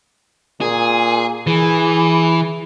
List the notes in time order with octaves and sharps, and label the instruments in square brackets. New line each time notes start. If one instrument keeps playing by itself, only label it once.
[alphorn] A#2 [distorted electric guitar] G#4
[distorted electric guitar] E3 [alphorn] G#4